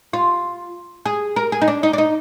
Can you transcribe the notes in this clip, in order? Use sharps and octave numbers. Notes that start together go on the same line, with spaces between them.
F4
G#4
A#4
G#4
D#4
D4
D#4
D4
D#4